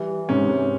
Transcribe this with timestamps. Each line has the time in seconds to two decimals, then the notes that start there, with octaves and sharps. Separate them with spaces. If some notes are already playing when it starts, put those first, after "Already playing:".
Already playing: E3 G3
0.29 G#2 C3 C#4
0.49 G#2